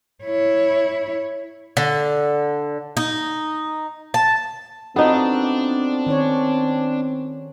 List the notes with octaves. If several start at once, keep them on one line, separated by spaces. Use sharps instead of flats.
E4 C#5
D3
D#4
A5
B3 C4 D4 D#4 F4 F#4 A4 D#5
D#3 C#4 C#5